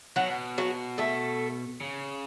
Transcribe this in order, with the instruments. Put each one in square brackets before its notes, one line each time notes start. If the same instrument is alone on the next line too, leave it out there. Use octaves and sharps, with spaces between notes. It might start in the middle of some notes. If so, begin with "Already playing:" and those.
[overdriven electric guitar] B2 [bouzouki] F#3 F#4
[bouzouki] F#3 F#4
A3 A4
[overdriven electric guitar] C#3